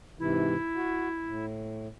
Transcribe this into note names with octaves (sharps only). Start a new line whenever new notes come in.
G#2 C3 E3 E4
F#4
A2